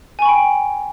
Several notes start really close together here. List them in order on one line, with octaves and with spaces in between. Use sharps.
G#5 C#6 B5 G5